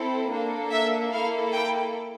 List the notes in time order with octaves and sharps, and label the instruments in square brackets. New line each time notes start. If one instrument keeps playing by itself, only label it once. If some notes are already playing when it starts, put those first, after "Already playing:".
Already playing: [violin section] C4 E4 A4
A#3 D4 A4
E5
A#3 E4 A4 F5
G5